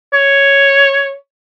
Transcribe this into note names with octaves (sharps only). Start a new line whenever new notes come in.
C#5